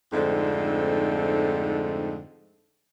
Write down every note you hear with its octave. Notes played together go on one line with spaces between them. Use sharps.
F2 G#2 D3 A3 C4 D#4